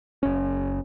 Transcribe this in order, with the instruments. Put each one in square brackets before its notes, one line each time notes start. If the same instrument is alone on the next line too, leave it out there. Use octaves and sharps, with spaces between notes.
[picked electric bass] F#1 C#4